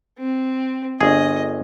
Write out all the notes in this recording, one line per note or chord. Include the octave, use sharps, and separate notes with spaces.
C4
G1 G#4 D#5